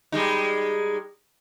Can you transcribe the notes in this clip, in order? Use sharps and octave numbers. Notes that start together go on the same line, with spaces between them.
G3 G#3 D#4